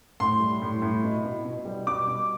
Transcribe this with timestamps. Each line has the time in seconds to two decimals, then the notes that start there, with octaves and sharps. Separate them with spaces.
0.20 A2 C6
0.40 G3
0.62 A2
0.82 A2
1.03 B2
1.24 B2
1.45 B2
1.65 G3
1.87 B2 D6
2.07 B2